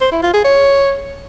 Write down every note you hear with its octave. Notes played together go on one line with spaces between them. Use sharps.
C5
E4
F4
G#4
C#5